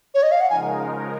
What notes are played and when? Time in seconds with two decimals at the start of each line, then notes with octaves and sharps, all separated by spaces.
0.14 C#5
0.23 D#5
0.31 F5
0.41 F#5
0.50 C#3 F3 G#3 D#4 A#4 G#5